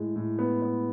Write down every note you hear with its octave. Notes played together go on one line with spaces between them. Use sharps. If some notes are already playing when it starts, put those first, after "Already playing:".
Already playing: A2 G#3
A2
B3
B3